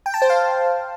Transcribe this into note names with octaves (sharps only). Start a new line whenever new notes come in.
G5
A5
C5
F5